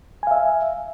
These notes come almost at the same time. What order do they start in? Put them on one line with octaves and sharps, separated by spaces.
G#5 F5 E5